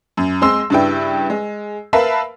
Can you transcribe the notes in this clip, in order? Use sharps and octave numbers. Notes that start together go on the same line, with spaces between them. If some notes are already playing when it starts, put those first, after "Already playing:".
F#2
G#3 C4 C6 E6
G2 C#3 D4 E4 B4 G5
G#3
A#4 B4 E5 F5 A5 B5